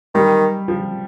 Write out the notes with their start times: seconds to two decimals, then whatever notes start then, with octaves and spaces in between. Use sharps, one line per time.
0.14 D#3 G3
0.68 F3